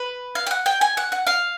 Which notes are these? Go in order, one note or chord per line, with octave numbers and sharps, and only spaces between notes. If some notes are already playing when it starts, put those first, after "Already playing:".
Already playing: B4
F5
G5
F#5
G5
G#5
F#5
F#5
F5